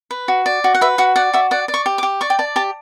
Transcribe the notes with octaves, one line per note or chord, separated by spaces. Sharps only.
B4
F#4
D5
F#4
F#5
B4 E5
F#4 F#5
D5 F#5
F#4 E5
D5 F#5
D5
C#6
G4
D6
G4
D5 C#6
G5
D5 A5
G4 A5